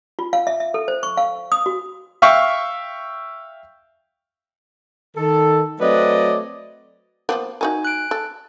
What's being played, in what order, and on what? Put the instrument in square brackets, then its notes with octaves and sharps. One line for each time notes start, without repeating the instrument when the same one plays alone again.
[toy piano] F4
F5
E5
E5
A4
C5
C#6
F5
D#6
F#4
[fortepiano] E5 F5 G5 C#6
[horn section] D#3 A4
F#3 A3 C4 B4 D5 D#5
[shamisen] F3 A#3 B3
[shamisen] D#4 F#4 A#4 [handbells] G#5
[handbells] F#6 D7
[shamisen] A4